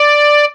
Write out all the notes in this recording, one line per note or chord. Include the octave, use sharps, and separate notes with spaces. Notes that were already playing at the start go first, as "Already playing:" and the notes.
Already playing: D5